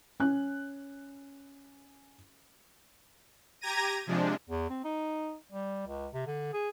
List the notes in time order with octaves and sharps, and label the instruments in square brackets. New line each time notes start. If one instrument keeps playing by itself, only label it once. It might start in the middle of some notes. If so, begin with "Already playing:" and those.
[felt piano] C#4 F#6
[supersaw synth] G4 A#5 G#6 A#6 D#7
C3 F3 G#3 D4
[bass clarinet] E2
C4
D#4
G3
C#2
C3
D3
G#4